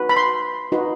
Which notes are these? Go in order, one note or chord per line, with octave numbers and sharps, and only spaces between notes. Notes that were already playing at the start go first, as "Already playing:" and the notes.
Already playing: D#4 F#4 B4
B5
C6
D#4 F#4 B4